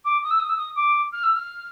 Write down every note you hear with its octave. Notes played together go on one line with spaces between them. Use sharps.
D6
D#6
E6
D#6
E6
D#6
D6
F6
E6
F6